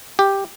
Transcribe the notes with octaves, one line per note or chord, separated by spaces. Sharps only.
G4